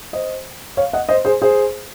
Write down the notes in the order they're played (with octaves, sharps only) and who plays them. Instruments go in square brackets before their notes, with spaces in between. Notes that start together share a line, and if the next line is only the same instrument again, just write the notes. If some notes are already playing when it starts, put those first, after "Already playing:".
[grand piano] C5 D#5
C#5 F5
D#5 F#5
C5 D#5
G#4 C5
G#4 C5